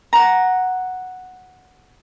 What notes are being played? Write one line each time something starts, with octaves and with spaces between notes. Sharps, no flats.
F#5 A#5